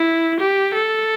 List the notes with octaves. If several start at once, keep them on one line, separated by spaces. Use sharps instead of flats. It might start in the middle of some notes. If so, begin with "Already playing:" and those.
Already playing: E4
G4
A4